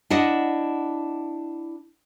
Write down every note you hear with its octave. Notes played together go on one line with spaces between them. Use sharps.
D4 E4 D#5 F#5